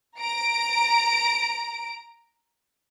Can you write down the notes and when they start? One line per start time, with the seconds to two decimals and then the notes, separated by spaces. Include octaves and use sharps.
0.19 A#5 D7